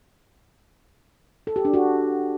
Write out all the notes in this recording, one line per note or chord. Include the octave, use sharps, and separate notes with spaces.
A4
G4
D4
F#4